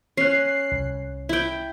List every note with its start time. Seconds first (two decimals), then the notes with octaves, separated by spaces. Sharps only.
0.17 C#4 F#6 C7
0.72 C2
1.29 E4 G5